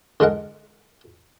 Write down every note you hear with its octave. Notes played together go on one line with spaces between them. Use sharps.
D3 G#3 A#4 F#5